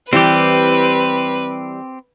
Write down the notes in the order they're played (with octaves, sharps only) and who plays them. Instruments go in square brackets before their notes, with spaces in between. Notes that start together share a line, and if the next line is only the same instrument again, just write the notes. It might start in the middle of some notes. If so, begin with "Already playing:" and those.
[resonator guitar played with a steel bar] E3 G3 [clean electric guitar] C4 G4 [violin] B4